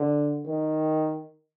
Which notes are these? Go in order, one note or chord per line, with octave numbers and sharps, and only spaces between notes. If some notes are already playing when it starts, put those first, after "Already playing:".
Already playing: D3
D#3